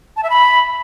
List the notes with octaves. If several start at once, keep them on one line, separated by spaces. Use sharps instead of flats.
A5
E5
B5